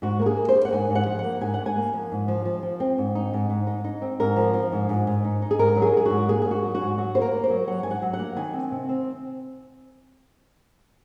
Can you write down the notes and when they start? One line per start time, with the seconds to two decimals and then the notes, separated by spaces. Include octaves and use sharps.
0.02 G#2 F#4
0.19 A#3 A#4
0.26 G#4
0.37 A#3
0.49 C5
0.55 A#3
0.65 F#5
0.73 G#2 G#5
0.90 G#2
0.95 F#5
1.07 F3
1.19 F#5
1.24 A#3
1.41 G#2 G#5
1.54 G#2 F#5
1.66 G#5
1.77 A#3
1.94 F3
2.12 G#2
2.28 F3
2.45 F3
2.63 F3
2.80 C4
2.98 G#2
3.15 D#4
3.33 G#2
3.50 G#2
3.67 D#4
3.84 D#4
4.02 C4
4.20 G#2 A#4
4.36 F3
4.54 F3
4.72 G#2
4.89 G#2
5.07 G#2
5.24 D#4
5.42 D#4
5.51 G#4
5.59 G#2 A#4
5.76 F#3
5.82 G#4
5.93 F#3 G#4
6.06 G#2 F#4
6.29 A#3 G#4
6.42 G#2 G#4
6.51 F#4
6.63 F#3
6.75 F#4
6.81 G#2
6.98 F#3 F#4
7.15 A#3 C5
7.22 A#4
7.33 A#3
7.44 C5
7.50 F#3
7.67 F#3 F#5
7.83 G#2 G#5
7.91 F#5
8.02 F#3
8.13 F#5
8.19 A#3
8.36 D#3 G#5
8.54 C4
8.71 C3
8.89 C4